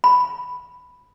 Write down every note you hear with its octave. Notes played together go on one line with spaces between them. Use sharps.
B5